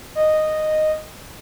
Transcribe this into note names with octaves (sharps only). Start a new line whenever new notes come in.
D#5